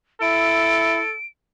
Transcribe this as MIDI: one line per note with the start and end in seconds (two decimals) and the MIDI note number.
0.21 1.00 64
0.21 1.15 69
0.21 1.26 98